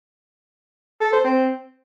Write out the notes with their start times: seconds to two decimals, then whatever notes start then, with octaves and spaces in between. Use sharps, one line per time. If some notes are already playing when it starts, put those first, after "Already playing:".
1.01 A4
1.13 C5
1.25 C4